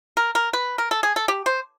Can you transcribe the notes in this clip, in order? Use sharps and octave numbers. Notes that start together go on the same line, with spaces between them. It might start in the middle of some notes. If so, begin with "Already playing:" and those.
A#4
A#4
B4
A#4
A4
G#4
A4
G4
C5